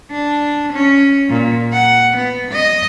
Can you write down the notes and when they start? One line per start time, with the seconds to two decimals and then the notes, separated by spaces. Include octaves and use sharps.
0.11 D4
0.73 C#4
1.29 A#2
1.73 F#5
2.17 B3
2.51 D#5